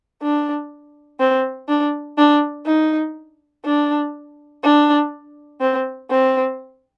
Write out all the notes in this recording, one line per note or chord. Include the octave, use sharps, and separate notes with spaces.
D4
C4
D4
D4
D#4
D4
D4
C4
C4